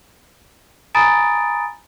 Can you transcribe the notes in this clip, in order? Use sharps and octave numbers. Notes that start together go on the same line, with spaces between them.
G#5 A#5 B5 D#6 A6 D7